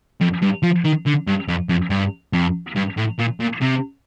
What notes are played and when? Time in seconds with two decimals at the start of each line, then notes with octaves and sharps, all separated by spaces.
0.21 F2
0.42 G2
0.63 F3
0.84 D#3
1.06 D3
1.27 G2
1.48 F2
1.69 F2
1.90 G2
2.33 F2
2.76 G2
2.97 A2
3.19 A#2
3.40 A#2
3.61 C3